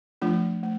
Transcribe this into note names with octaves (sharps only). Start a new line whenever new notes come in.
F3 A3 D4 F4
A3